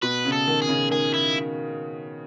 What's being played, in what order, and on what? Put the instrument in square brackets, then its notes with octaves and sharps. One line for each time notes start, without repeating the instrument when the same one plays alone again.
[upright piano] B2 [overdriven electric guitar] B4
[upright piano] C#3
[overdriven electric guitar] A4
[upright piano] D#3
[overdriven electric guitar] G#4
[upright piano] C#3
[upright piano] D#3 [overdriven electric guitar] G#4
[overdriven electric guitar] E4